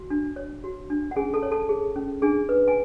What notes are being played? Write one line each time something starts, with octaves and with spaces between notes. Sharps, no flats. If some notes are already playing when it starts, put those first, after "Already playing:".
Already playing: F#4
D4
C#5
F#4
D4
F#5
C#4 G#4 G#5
A4 A5
C#5
A4 A5
G#4
C#4
D4 G#4 G#5
B4
G#5